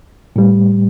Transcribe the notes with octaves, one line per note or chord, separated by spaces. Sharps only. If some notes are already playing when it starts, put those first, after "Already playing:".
A2 G3